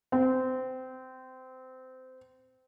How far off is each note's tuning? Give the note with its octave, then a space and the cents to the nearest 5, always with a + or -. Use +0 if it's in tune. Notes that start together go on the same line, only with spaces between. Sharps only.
C4 -20